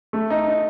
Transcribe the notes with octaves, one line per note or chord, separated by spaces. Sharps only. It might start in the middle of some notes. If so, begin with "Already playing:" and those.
A3
D#4
D#4